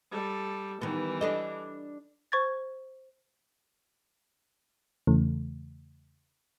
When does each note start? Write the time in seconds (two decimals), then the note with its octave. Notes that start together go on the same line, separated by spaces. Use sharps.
0.11 G3 A4
0.81 D#3 E3 G3 B3
1.21 D4 A4 D#5
2.32 C5 C#6 G#6 A6
5.07 E2 C#3 E3 A3